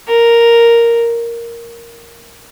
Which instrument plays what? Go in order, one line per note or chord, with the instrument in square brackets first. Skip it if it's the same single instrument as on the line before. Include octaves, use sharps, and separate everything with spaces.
[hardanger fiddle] A#4